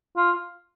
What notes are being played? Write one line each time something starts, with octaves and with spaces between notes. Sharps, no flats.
F4